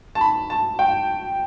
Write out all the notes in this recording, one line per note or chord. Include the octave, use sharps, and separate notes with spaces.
A5
B5
A5
G5